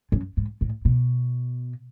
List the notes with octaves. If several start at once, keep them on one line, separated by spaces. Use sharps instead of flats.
F#2
G#2
A2
B2